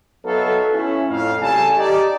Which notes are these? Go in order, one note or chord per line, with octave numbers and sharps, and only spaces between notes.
F#3 B3 D#4 A4 E5 F5
C#4 E4
F2 A2 F5
C#3 G3 A4 G#5 A5
D#4 G4 D5